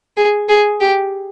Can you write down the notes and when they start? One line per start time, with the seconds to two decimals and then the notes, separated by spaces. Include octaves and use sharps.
0.17 G#4
0.49 G#4
0.80 G4